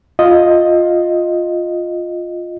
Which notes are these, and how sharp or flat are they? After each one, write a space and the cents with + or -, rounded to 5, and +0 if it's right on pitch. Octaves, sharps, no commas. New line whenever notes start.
F4 +10 D#5 +0